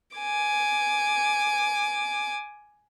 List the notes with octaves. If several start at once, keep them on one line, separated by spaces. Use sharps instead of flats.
G#5 D6